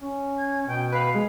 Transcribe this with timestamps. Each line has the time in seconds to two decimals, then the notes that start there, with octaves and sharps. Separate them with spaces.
0.01 C#4
0.38 G#6
0.67 B2 G5
0.92 B4 F5
1.14 G#3